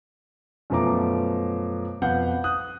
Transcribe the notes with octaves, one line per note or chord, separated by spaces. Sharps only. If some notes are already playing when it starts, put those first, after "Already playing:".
F#2 B2 F3 A3 A#5 D6
F2 B2 B4 F5 F#5 G6
D#6 F#6 G6